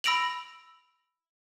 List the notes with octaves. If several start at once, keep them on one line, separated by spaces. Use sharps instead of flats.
B5 E6 A#6 D7 F7 F#7